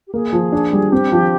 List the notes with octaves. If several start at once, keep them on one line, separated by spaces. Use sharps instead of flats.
G4
A#3 G#4
F3
D4
G3
C4 G4
F3